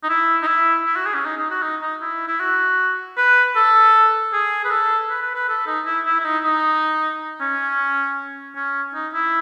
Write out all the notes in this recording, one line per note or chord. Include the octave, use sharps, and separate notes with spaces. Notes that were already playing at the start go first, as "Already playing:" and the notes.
D#4
E4
D#4
E4
E4
F#4
G#4
C#4
D#4
D#4
F#4
D#4
D#4
E4
E4
F#4
B4
A4
G#4
B4
A4
B4
B4
B4
A4
D#4
E4
E4
E4
D#4
D#4
C#4
C#4
D#4
E4